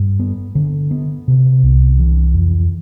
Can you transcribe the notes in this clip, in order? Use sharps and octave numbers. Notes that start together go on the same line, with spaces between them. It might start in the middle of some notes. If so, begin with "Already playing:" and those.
Already playing: G2
B3
D3
B3
C3
C2
E3
F2